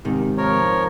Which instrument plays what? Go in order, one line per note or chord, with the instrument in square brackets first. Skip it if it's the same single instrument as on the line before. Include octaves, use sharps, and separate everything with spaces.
[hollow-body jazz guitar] G#2 C3 D#3
[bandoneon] F3 A#4 C#5